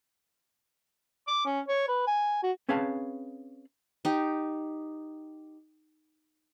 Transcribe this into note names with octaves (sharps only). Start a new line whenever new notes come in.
D6
C#4
C#5
B4
G#5
F#4
C4 C#4 G#4 B4 F5 A5
D#4 G4